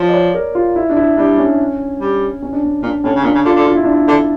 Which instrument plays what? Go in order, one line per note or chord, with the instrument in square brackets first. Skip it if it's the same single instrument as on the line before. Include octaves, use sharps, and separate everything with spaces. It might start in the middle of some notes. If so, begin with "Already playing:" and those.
Already playing: [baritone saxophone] F3 [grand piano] C#5
[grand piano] D5
C#5
A#4
F4
E4
D4
E4
[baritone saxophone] G3 [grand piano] D4
[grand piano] C#4
[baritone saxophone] G3
[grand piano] C#4
D4
C#4
[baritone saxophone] A#2 [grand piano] D4
[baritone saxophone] A2 [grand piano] C#4
[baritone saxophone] C#3
[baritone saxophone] A#2 [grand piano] D4
[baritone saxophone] C#3
[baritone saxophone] D3 [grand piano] F4
[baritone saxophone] D3
[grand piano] F4
E4
D4
E4
[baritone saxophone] D3